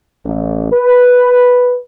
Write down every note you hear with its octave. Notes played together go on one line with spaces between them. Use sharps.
A1
B4